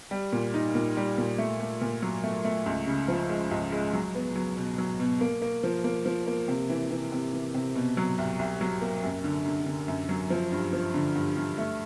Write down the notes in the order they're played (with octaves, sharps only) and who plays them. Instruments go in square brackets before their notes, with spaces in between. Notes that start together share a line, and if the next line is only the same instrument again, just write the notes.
[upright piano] G3
A#2
D#4
A#2
G3
A#2
A3
A3
A#2
F#3
A3
A3
C#2
C#3
F3
G#3
C#2
G#3
F#3
B3
F#3
B2
F#3
B2
A#3
A#3
F3
A#3
F3
A#3
C3
E3
E3
C3
E3
C3
B2
F#3
C2
C2
F#3
A#3
F#2
D3
D3
D3
F#2
F#3
F3
G2
F3
D3
G2
G2
A3